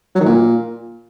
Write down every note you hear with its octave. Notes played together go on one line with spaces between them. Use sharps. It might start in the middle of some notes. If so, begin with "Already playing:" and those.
F#3
D#3
A#2